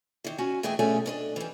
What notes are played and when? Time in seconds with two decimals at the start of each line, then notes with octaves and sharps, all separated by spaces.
0.24 D#3 E3
0.38 C#4 F#4 G#5
0.63 E3 A3 G#4 D#5 E5 G5
0.79 G2 B2 A3 C#4 G#4
1.06 D4 A#4 D#5
1.36 E3 G3